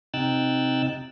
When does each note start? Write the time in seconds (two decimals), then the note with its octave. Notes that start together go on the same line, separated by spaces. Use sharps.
0.14 C3 D#4 G5 E6 F#6 A6